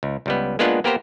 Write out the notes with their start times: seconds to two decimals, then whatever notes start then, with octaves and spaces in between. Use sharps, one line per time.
0.03 C#2
0.26 C#2 G3 B3
0.59 G#3 A#3 B3 D4 F4 F#5
0.84 A#3 B3 G4 A#4 C5 A#5